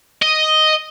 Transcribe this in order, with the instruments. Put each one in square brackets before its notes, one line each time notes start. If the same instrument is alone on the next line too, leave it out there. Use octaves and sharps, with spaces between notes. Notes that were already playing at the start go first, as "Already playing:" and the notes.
[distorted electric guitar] D#5